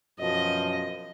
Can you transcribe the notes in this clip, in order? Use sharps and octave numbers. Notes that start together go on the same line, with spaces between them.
F#2 B2 F3 D#5